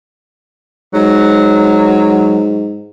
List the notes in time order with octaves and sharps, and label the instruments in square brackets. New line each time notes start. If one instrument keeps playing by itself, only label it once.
[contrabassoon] G#2 [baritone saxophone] F#3